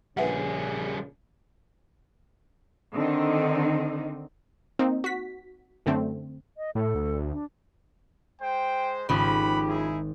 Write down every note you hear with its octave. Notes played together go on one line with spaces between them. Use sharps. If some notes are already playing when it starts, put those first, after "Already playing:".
A#1 C#3 G3 G#4 B4 E5 F#5
D3 D#3 C4 D#4
A#3 C4 D#4
F#4 B6
F#2 D3 A3 C4
D#5
A2 A4
D2
D4
G#3 C5 G5
G#1 C#3 F3 G4 F#5 B5
D#4 E4 G#4